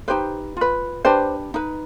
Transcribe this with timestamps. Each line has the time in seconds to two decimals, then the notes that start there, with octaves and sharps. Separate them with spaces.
0.08 D#4 G4 B4 C5
0.57 F4 B4
1.05 D4 G4 B4 C5
1.54 D#4 B4